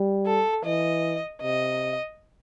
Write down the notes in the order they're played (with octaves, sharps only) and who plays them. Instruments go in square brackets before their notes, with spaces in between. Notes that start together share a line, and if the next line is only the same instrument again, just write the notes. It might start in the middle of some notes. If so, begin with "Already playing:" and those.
Already playing: [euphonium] G3
[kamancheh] A4
[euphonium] E3 [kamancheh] D#5
[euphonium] C3 [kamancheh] D#5